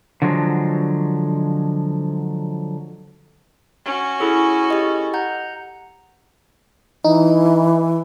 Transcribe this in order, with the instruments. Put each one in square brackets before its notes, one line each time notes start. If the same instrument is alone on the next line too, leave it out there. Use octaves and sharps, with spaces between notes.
[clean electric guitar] D3 F3 F#3 G#3
[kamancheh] C#4 F#4
[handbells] E4 G#4 A4
[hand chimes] G4 D#5
[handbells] F#5 A#5 G6
[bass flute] E3 [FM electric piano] D#4